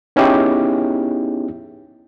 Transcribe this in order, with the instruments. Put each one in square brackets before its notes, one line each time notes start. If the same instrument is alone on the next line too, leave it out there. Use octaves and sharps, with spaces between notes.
[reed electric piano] B3 C#4 D#4 E4 G4 G#4